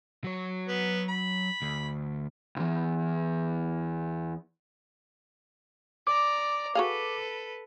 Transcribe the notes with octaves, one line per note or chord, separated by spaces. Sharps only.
F#3 C#5
B3
B5
D2
B1 E2
D5 A#5 D6
F#4 G#4 A4 B4 F5